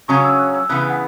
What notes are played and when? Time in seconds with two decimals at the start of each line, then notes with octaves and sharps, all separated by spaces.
0.08 C#3 F#3 C#4 C#6
0.24 E6
0.39 F#6
0.54 E6
0.69 C#3 E3 B3 F#6
0.80 F#6
0.90 F#5